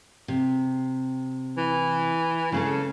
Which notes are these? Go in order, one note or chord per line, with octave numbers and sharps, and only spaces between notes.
C3
E3
C#3 G#3 C#4 A4